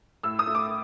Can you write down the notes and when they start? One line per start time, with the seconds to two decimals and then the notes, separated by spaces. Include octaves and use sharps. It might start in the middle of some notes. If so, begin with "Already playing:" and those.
0.23 A2 E6
0.39 D#6
0.47 A3
0.55 D6